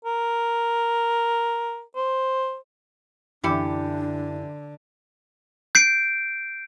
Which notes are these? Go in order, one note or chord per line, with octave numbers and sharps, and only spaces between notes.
A#4
C5
F#2 D3 E3 D4 E4 G4 C#7
G6 C7 D7